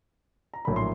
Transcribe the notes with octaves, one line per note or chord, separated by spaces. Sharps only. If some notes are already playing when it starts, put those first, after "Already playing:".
A#5
A#1 A2 F#3 A#3 B5
C6